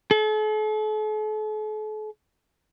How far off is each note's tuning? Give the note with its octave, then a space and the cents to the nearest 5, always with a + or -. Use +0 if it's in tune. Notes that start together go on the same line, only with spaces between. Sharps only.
A4 -45